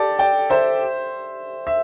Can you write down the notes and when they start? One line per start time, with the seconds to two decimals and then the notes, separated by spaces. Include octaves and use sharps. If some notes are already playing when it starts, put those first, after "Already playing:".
Already playing: G4 A4 D5
0.19 D5 G5
0.50 C5 E5
1.67 E5